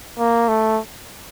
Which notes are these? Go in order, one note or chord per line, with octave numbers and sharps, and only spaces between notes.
A#3
A3